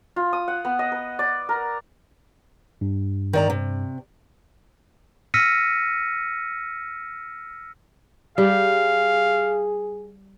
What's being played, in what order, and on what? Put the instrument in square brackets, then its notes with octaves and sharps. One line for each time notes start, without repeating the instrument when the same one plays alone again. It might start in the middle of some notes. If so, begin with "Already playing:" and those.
[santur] F4
D#6
F#5
B3
D#5
B4
D5
A#4
[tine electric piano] G2
[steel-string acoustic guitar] D#3 D5 A#5
C3
[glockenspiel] E6 F6 A#6 B6 C#7 D#7
[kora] G3 G4 [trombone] G#4 [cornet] F5